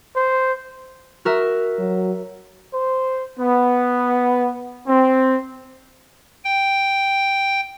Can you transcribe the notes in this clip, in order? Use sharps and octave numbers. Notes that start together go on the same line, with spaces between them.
C5
F#4 A#4 E5
F#3
C5
B3
C4
G5